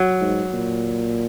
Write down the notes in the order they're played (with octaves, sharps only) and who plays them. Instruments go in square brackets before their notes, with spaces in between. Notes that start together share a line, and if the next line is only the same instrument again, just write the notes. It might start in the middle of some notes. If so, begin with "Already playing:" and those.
Already playing: [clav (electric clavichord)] F#3
[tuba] G#2
A#2